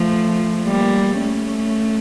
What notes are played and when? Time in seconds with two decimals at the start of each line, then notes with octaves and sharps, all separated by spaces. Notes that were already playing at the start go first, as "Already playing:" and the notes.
Already playing: F3 A3
0.65 G3 A#3
1.21 A3 C#4